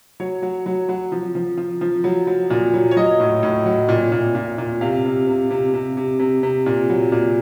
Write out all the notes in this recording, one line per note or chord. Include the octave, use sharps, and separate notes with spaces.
F#3 C#5
F#3
F#3
F#3
F3
F3
F3
F3
F#3
F#3
A#2
F#3
C#5
F#3 D#5
A2
A2
F#3
A#2
A#2
A#2
A#2
C3 F5
C3
C3
C3
C3
C3
C3
C3
A#2
F#3
A#2